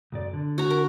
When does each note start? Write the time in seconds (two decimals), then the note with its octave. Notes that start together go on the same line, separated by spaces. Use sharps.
0.12 B1 F#2 D5
0.33 D3
0.58 F#4 A#5
0.71 A#4